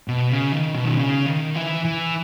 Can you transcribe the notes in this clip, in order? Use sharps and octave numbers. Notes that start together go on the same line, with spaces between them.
B2
C#3
D#3
B2
D#3
C#3
D#3
E3
E3